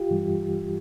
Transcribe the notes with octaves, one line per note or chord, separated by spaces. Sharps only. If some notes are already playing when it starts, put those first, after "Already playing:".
Already playing: F4 G4
G2 E3 G3